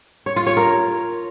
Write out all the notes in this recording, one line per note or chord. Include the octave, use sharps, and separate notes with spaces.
C#5
F4
C#5
A#4